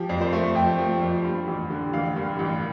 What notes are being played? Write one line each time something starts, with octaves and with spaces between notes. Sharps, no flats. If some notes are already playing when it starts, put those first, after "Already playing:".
Already playing: F3 G4
F2
C5
A3
F2 G5
F3
F2
G2
A1
D3
A1 F5
G2
A1